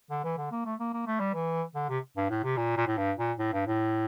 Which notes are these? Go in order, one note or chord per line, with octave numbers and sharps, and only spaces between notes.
D3
E3
D3
A#3
A3
A#3
A#3
A3
G3
E3
D3
C3
G2
A2
C3
A#2
A#2
A2
G2
A#2
A2
G2
A2